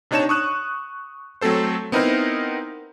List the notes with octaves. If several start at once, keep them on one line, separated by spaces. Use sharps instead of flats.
C3 D4 D#4 C#5 A5 E7
C#6 D#6 F#6
F#3 A3 C4 A4 C5
B3 C4 D#4 E4 A#4 C5